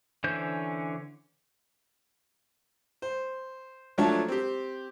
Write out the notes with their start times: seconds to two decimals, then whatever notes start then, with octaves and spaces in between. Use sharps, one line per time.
0.24 D3 E3 C#4 C5 G6
3.02 C5
3.98 F3 F#3 A3 D4 C#5 A5
4.28 C4 G4